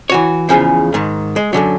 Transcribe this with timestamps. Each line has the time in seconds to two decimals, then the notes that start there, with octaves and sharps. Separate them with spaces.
0.10 E3 F#4 C#5
0.49 E2 G2 C#3 F3
0.94 G#2 D#3
1.36 G#3
1.53 F#2 A#2 D3 F#3